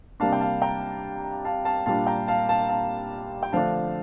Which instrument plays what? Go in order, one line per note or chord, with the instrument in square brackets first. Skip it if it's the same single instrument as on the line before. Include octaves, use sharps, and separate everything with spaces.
[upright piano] C3 G3 A#3 D4 F5 A5
G5
F5 A5
G5 A#5
F5 A5
F5 A5
A#2 G3 D4 F5 A5
G5 A#5
F5 A5
F5 A5
F5 A5
G5
D3 F3 A3 D4 F5 A5